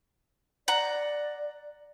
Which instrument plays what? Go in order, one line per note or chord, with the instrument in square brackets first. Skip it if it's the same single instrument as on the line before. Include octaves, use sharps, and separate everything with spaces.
[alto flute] D5 [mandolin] F#5 A#5